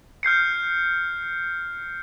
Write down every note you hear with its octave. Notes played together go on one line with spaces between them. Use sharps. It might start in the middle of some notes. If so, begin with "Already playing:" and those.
F6 G6 C7 C#7